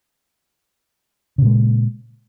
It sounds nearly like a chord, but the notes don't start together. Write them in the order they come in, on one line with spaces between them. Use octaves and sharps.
C#3 A#2 G#3